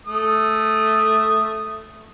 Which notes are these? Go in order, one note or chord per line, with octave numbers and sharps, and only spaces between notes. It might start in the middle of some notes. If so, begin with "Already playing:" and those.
A3 D#6